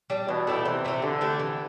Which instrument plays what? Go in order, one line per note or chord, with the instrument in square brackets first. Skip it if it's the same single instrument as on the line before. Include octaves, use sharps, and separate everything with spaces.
[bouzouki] G3 D4
[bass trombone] B2 [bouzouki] E3
[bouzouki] A3 E4 G4
[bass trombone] C3 [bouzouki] E3
[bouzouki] A3 E4 G4
[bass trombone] D3 [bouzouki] E3
[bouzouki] A3 E4 G4
E3